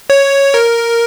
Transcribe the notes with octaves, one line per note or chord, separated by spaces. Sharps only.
C#5
A#4